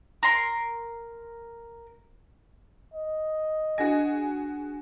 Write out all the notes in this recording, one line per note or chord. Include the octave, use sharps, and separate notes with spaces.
A#4 C6
D#5
D4 F#4 G#4 G#5 A#6